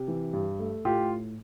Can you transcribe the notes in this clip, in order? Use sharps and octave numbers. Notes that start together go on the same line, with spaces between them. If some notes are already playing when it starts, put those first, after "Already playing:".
Already playing: C3
E3
G2
A3
A2 F4 G4